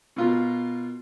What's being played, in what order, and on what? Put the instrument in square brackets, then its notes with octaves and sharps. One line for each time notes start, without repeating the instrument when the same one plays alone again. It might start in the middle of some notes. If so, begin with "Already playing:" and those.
[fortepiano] B2 F4 A#4